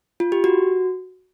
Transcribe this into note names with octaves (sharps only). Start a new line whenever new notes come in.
F4
G4
F#4